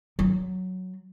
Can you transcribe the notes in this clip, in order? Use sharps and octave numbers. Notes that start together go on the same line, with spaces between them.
F#3